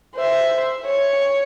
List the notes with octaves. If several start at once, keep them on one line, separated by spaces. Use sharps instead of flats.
C5 E5
C#5